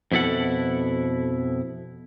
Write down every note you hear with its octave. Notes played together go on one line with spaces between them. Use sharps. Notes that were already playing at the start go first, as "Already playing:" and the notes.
F2 B2 E4 A4 F#5